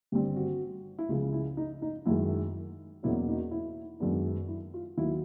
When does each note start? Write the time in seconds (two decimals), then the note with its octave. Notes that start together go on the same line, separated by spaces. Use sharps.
0.12 G1 G2 D#3 G3 C4 G4
0.36 F#4
0.99 E4
1.09 C#2 C#3 F3 F4
1.33 E4
1.57 D#4
1.82 D#4
2.06 F#2 D#3 G#3 E4
3.03 E2 B2 F#3 A#3 C#4 E4
3.28 D#4
3.51 E4
4.00 F#2 D#3 G#3 B3 D4
4.49 E4
4.74 F4
4.97 D#2 D#3 F#3 E4